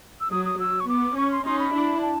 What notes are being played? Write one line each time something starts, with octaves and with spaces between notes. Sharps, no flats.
E6
F#3 D#6
D#6
F#3 E6
C#6
B3 D6
C#4 C#6
C6
C#4 D#4 C6
B5
D4 E4
A5